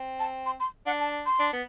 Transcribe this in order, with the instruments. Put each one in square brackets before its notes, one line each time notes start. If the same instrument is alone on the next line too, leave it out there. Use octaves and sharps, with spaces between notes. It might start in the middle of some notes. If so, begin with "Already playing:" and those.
Already playing: [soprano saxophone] C4
[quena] A5
C6
C6
[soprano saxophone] D4 [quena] F#5
[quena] A5
C6
[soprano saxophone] D4
B3